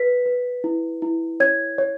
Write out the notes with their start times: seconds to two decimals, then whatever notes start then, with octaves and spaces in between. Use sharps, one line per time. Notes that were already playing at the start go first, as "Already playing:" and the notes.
Already playing: B4 B6
0.26 B4
0.64 E4
1.02 E4
1.40 C#5 G#6
1.78 C#5